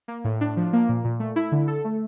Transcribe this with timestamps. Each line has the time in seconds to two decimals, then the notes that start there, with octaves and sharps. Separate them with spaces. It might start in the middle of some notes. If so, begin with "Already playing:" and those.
0.08 A#3
0.24 A2
0.41 D4
0.57 F3
0.73 A#3
0.89 A#2
1.05 A#2
1.20 A3
1.36 E4
1.52 D3
1.68 A4
1.84 A3